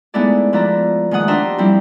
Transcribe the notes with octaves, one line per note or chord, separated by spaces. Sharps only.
G#3 A3 B3 D#4 E4 D5
F3 B4 D5 E5 A#5
D#3 G#3 A3 F#5 D#6
D4 G4 C5 E5 A#5
F3 G3 C4 E4 G4